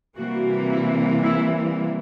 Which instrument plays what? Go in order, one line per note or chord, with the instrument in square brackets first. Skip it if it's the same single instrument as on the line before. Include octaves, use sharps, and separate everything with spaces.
[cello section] C3 E3 G3 A#3 [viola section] F#4
[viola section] E4
E4